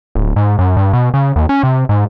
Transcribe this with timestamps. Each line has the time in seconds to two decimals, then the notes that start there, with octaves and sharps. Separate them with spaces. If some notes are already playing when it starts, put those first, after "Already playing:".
0.15 D1
0.36 G#2
0.59 F#2
0.77 G2
0.93 B2
1.14 C#3
1.36 D#2
1.49 C#4
1.63 C3
1.89 G#2